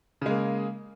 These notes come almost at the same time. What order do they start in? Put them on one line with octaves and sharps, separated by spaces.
C#3 G#3 A#3